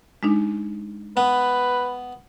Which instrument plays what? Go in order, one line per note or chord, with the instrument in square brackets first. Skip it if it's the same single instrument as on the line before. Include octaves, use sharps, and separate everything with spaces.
[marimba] G#3 D4 D#4
[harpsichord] B3 [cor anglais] B4